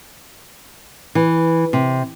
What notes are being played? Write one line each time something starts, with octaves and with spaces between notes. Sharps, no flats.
E3
C3